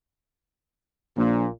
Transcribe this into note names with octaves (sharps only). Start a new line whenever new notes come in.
A#1 A#2